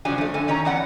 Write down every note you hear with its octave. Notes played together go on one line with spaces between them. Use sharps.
C#3 F3 F#3 D4 G#5
F3 A3
G2 D3 G#5
D#3 C#4 C#5 A#5
E2 E3 D5 F#5